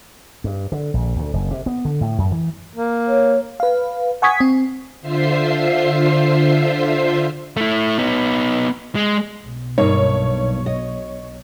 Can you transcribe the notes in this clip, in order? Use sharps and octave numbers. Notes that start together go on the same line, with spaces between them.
G2
D3
A#1
D2
F#1
C3
B3
D3
A2
F#2
E3
A#3
C#5
B4 F5
F#5 G#5 C#6 D#6 G#6 B6
C4
D3 F4 C5 E5 C7
A3 E4
B3 D#4
G#3
B1
G2 A#3 D#4 C#5
D#5